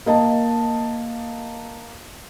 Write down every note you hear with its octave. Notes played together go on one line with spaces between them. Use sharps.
A#3 D#5 A5